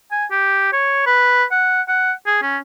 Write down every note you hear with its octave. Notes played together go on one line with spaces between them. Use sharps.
G#5
G4
C#5
B4
F#5
F#5
G#4
C#4